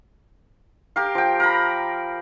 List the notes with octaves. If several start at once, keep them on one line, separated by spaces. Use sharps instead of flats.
G4 A#4 F5
F3 G5
A#4 A#5 B5